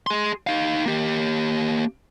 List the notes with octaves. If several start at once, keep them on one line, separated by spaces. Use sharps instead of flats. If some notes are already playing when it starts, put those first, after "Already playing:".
G#4 C6
D#4 F5
A#3 G4